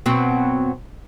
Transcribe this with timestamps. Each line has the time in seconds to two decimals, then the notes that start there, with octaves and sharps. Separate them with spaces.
0.06 B2 F#3 C4